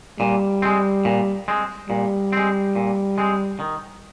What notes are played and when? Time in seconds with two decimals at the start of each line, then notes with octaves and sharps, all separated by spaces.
0.20 A#2 G3
0.62 G#3 C4
1.05 A#2
1.48 G#3 C4
1.90 A#2 G3
2.33 G#3 C4
2.76 A#2
3.18 G#3 C4
3.60 D#3